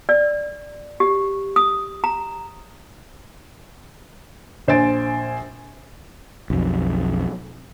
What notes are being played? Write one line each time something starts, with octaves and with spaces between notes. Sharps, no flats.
D5
G4
D#6
A#5
A#1 C5 G#5 A6 D7
B1 F2